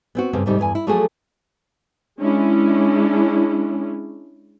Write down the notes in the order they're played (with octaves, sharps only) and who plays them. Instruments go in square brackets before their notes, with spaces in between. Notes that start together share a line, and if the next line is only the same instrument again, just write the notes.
[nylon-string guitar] B3 C4 F#4
G2 C#3 A#3 C4 C#4
D2 G#2 C3 G3 C4 D#4
E2 G2 E4 G#5
E4
F3 F#3 A3 A#3 F#4 G#4
[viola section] G#3 C#4 D4 E4